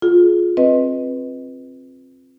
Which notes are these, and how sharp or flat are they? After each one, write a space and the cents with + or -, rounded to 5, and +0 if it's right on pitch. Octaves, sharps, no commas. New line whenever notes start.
F4 +15 G#4 +25
C4 +15 B4 +0 D#5 +0